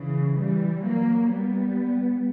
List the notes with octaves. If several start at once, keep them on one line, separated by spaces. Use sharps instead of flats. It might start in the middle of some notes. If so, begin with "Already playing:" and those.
Already playing: C#3 E3
E3 G3
F#3 A#3
G3 B3